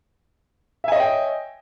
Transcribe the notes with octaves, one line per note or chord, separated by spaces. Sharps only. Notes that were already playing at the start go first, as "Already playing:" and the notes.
C#5 D#5 E5 G5 G#5